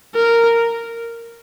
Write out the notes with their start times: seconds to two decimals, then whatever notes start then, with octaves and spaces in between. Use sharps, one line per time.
0.15 A#4